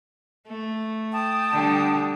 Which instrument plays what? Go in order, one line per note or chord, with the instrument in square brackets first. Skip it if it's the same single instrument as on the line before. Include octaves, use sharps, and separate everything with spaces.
[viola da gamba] A3
[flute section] G5 A5 D#6
[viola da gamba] D3 G3